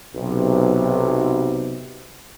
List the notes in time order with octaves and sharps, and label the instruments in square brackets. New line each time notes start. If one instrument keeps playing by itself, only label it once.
[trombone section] B1 C3